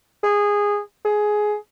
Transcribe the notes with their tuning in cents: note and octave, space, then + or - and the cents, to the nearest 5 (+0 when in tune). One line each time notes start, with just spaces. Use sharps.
G#4 -15
G#4 +15